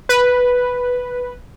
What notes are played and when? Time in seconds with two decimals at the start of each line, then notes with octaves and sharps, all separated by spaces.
0.09 B4